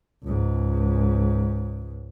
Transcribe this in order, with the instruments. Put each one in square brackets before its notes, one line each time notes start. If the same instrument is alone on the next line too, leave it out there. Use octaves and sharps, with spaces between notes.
[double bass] C#2 G#2